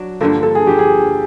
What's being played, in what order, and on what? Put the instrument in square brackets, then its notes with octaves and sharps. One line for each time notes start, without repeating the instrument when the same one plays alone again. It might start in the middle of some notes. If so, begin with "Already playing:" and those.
Already playing: [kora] F#3 D4
[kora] G2 D3 F3 A#3 [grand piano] A4
[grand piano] A4
G#4
[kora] G2 D3 F3 A#3 [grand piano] G4
[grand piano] G#4